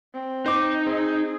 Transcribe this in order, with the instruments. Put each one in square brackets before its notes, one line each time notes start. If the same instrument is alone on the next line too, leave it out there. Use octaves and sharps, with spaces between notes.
[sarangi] C4
[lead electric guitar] D#4 [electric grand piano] C5 D6
[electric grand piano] C4 [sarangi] G#4